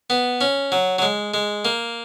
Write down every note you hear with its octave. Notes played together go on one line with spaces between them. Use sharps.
B3
C#4
F#3
F#3
G#3
G#3
A#3